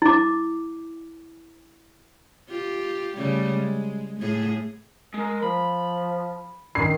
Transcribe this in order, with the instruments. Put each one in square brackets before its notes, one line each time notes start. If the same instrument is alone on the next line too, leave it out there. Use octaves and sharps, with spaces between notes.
[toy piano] E4 D6
[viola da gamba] F4 G4
C#3 G3 A3
G#3
A2 G#4
[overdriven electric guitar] G#3 [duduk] A#4
[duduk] F3 [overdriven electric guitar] B5
[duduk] D#3 [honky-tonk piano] C7